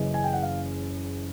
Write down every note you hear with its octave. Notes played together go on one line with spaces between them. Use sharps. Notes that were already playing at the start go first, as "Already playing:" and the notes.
Already playing: F#1 F#2 C#3 E3 D#5
G#5
G5
F#5
F5